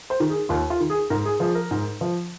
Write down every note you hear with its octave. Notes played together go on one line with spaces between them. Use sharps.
C5
D#3
G#4
D#2 F4
F4
D#3
G#4
G#2 A#4
G#4
F3 G#4
A#4
G#2
F3